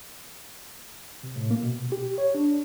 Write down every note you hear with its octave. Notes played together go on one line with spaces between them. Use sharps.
C3
A2
A#3
B2
G4
C#5
D4